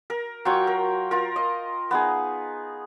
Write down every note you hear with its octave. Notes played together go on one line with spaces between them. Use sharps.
A#4
F#3 F4 G5 C#6
A#4
F4 A#4
D#5
B3 D#4 G#4